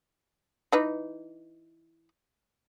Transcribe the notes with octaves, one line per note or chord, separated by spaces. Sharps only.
E3 D#4 B4